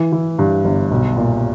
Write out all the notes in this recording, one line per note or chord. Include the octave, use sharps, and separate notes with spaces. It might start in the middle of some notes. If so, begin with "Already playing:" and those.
Already playing: E3
E3
G2
G1
B1
A#2